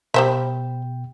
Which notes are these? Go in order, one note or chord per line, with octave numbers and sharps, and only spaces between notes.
B2 G3 C5 E5 G5